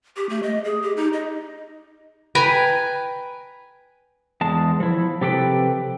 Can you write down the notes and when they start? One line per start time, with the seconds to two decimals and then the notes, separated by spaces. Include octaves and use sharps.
0.17 G4
0.29 A3
0.43 D#5
0.64 G#4
0.82 G4
0.97 D#4
1.13 D#5
2.35 B4 G5 G#5 A#5
4.41 E2 G#3 A5
4.80 F3 E4
5.21 C3 F3 G4 A4 B4 G5